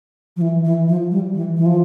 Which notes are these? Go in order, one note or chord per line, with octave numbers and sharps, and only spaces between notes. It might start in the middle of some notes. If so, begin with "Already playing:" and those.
F3
E3
E3
F3
G3
E3
E3
F3